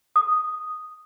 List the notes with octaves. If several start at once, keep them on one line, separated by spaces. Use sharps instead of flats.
D#6